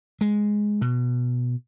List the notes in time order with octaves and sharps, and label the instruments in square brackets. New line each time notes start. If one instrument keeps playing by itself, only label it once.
[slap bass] G#3
B2